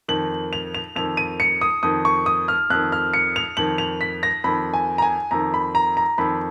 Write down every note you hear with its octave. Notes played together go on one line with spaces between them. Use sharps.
F2 D#3 F#7
F7
F7
F2 D#3 F7
D#7
C#7
D#6
F2 D#3 D#6
C#6
D#6
F6
F2 D#3 F#6
F6
C#7
F7
F2 D#3 F#7
F7
B6
A#6
F2 D#3 B5
G#5
A#5
G#5
F2 D#3 A#5
B5
A#5
A#5
F2 D#3 B5